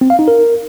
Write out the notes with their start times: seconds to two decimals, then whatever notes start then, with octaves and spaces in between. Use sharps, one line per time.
0.01 C4
0.10 F5
0.19 D#4
0.28 A#4